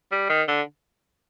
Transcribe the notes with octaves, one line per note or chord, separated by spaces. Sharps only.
G3
D#3
D3